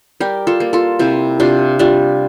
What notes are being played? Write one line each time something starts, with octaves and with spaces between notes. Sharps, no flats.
G3 G4 A#4
F4 A4
A#3
F4 A4
C3 E4 G4
C3 D4 F4
G3 D4 F4